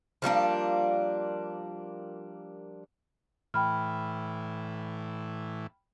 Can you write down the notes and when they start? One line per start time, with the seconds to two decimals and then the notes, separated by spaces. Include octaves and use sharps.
0.22 F3 G3 A#3 D4
3.54 A2 E3 G5 B5 F6